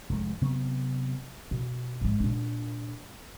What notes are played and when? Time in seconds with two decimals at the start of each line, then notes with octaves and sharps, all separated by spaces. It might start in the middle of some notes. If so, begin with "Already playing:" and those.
0.09 F1 A2 G#3
0.41 C3 F#3 B3 C4
1.51 B2
2.01 G#2 G#3
2.20 A#2 D4